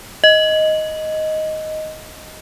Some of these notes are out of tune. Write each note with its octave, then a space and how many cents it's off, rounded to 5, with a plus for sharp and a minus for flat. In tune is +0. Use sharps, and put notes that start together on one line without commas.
D#5 +5